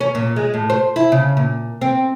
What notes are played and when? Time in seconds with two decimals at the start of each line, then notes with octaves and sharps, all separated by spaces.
0.01 C#4
0.15 A#2
0.36 G#3
0.54 A2
0.70 C5
0.96 E4
1.12 C#3
1.37 A#2
1.82 C4